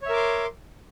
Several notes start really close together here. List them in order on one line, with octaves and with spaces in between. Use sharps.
C#5 E5 A#4 D6 C6